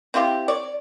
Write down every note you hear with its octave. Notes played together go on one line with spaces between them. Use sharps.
C4 E4 F4 G4
C#5 D5